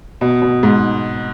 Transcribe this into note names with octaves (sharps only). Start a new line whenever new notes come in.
B2
B2
G#2